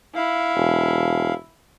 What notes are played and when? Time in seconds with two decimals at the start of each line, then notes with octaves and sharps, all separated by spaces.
0.15 E4 F5
0.56 E1